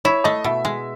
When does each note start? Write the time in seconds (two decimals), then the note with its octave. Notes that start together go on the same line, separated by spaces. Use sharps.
0.05 E4 C#5
0.24 A3 D#5
0.44 B2 E5
0.65 G#3